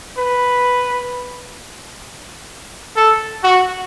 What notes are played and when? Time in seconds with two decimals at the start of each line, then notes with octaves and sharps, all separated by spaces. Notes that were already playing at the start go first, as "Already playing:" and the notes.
0.18 B4
2.96 A4
3.44 F#4